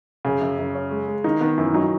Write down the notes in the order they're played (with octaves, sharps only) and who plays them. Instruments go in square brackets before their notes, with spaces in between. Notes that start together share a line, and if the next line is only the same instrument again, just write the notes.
[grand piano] F#2 [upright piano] C#3
[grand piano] F#2
F#2
C#4
G#3
G#3
[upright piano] D#3 [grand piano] D#4
[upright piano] D#3 [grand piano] B3
[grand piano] F#2 [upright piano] E3
[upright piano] F#3 [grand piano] D#4